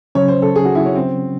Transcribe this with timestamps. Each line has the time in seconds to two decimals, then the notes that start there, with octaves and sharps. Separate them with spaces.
0.15 C#3 F#3 C#4 C#5
0.28 C5
0.42 A4
0.56 G#4
0.65 F#4
0.75 E4
0.86 C#4
0.95 C4